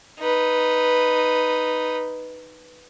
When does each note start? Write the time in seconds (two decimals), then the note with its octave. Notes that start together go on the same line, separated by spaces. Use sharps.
0.20 D#4 B4